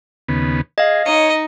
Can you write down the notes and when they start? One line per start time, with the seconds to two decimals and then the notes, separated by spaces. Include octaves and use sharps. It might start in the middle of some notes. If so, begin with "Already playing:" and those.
0.28 D#2 C#3 B3
0.78 G#4 D#5 F5
1.06 D#4 C#5 D#5 C#7